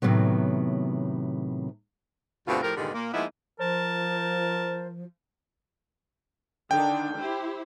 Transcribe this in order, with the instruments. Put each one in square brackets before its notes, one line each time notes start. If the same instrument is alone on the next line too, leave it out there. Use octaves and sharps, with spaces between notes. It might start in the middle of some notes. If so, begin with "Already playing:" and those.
[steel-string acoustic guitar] A2 C3 D#3 F#3 B3
[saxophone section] D2 G2 B2 D3 C4 F4
A2 F3 G4 A#4
E2 G2 A#2 D3 D#3 G#3
A#2 A#3
F3 G#3 A#3 B3 D#4 E4
[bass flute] F3 [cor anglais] A#4 [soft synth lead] C5 [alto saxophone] A5
[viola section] D3 D#3 D4 [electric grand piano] G5
[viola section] E4 G4 C5